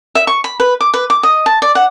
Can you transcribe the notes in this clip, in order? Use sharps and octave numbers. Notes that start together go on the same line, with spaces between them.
E5
C#6
B5
B4
D6
B4
D6
D#5
A5
D5
F#5